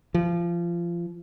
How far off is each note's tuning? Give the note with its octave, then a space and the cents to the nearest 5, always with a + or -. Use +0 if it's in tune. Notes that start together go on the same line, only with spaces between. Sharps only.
F3 -25